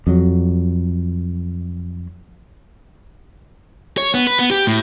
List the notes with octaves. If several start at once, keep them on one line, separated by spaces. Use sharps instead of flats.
F2 F#3
C#5
B3
B4
B3
G4
A2